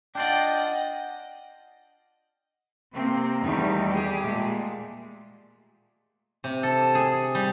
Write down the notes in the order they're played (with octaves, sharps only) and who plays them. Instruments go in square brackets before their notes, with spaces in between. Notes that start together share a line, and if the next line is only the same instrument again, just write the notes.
[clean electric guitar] D4 F4 D5 [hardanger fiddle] D#5 F#5 [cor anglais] G5
[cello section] C3 A#3 C4
E2 D#3 G3 A3 D#4
G4 G#4
A#2 G#3 A3
[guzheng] C3
A4
G#4
G3